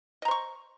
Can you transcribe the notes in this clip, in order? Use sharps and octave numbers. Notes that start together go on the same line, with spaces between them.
C5 D#5 A#5 C#6